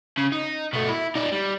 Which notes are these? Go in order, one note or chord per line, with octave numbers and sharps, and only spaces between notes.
C#3
D#4
B2 A3
E4
D#4 D5
G3